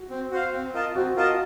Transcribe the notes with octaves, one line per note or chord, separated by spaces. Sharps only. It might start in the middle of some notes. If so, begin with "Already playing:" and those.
Already playing: F#4
C4
F#4 C5 F5
C4
F4 A#4 D#5 A5
C4 F#4
F4 A#4 D#5 A5